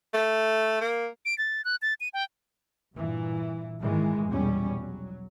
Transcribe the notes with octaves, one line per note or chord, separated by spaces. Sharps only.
A3
A#3
D7
A6
F#6
A6
D#7
G5
G2 A#2 E3
G#2 D#3 E3 G#3
A#1 E2 B2 G3 C#4
F#3